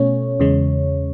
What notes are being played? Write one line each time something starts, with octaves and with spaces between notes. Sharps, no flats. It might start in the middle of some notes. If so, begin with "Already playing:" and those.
Already playing: B2 A3 C#4 C#5
E2 C#3 G#3